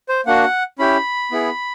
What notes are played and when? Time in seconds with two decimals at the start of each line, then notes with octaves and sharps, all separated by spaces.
0.09 C5
0.26 A#3 D4 F#4 F#5
0.79 C#4 E4 G4 B5
1.32 B3 E4 G#4